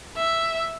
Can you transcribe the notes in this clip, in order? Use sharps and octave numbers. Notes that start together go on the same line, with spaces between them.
E5